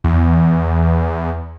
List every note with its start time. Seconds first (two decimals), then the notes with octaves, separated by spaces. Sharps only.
0.04 E2